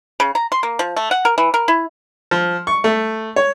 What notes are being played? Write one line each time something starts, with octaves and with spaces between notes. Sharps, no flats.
C#3
A#5
C6
A#3
F3
A3
F#5
A#4
E3
A#4
E4
F3
C#6
A3
C#5